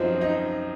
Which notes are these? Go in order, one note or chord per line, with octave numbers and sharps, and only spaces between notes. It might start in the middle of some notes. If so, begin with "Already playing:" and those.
Already playing: F#2 F3 C4 D#4
D#4